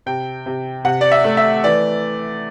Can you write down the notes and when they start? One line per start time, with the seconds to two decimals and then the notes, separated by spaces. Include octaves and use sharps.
0.06 C3 G5
0.46 C3
0.85 C3 F#5
1.01 D5
1.11 E5
1.24 A3
1.37 E5
1.64 E3 D5